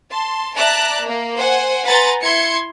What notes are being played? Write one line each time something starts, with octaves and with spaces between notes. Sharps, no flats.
A5 C6
D5 E5 A5 A#5 F#6
A#3
C5 F#5 G#5
B4 F#5 G#5 A#5 C6 A6
E4 C6 G#6 C#7